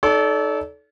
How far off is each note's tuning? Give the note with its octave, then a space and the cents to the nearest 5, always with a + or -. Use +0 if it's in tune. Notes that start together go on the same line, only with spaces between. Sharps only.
D#4 +0 A4 -20 D5 -45